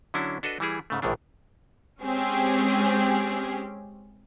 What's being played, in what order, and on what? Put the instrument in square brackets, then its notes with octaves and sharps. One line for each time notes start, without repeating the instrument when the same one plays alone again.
[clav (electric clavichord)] D3 F#3 C#4 D4 E4
D4 F#4 A4 B4 D#5
E3 G3 E4 G#4
G#2 C#3 A3
A#1 A2 D#3 E3 D4
[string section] G#3 C4 C#4 G4 G#4